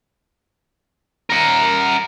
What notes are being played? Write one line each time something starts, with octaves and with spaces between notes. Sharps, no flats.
A#4 F#5